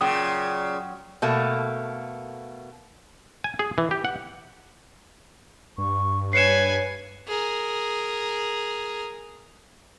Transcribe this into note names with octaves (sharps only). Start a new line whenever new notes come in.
A#2 C#3 F#3 G5 D#6
B2 A3 A#3
G#5
G#4
E3
G4
F#5
G2 C#6
B4 C#5 G#5 C7 C#7 E7
G#4 A#4